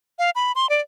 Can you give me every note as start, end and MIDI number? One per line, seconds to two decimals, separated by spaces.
0.19 0.30 77
0.35 0.52 83
0.55 0.69 84
0.70 0.81 74